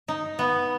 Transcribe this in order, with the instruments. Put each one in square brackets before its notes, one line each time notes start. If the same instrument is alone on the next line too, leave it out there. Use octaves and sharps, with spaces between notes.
[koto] D#4
B3